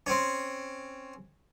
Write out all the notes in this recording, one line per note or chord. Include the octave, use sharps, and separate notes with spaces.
C4 C#4